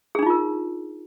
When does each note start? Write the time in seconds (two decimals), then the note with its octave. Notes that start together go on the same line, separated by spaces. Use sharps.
0.15 G#4
0.19 D4
0.23 D#4
0.26 F4
0.30 A#4